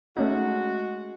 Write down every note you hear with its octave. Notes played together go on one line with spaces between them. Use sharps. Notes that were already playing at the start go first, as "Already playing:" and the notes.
G#3 A3 C#4 D#4 F#4